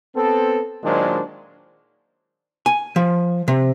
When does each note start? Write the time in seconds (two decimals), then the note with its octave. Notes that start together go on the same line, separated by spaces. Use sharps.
0.15 B3 C4 A4
0.84 A#2 D#3 F#3 G#3 D4 C5
2.66 G#5
2.96 F3
3.48 C3